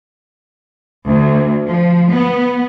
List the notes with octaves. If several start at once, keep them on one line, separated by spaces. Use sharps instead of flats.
D2
F3
B3